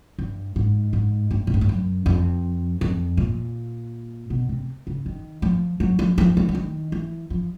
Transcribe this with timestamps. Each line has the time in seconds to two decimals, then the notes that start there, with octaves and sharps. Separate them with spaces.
0.19 G2
0.56 G#2
0.93 G#2
1.31 G2
1.47 A2
1.54 G#2
1.61 G2
1.69 F#2
2.06 F2
2.81 F2
3.17 A#2
4.30 B2
4.49 C3
4.87 C#3
5.06 D#3
5.42 F3
5.80 F#3
5.99 F3
6.18 F3
6.37 E3
6.49 E3
6.55 D#3
6.92 E3
7.30 F3